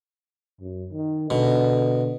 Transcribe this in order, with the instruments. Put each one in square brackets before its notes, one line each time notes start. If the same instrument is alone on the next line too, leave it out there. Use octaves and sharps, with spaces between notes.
[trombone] F#2
D#3
[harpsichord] B2 [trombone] D3